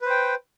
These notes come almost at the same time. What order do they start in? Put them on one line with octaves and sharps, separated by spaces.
B4 C5 G5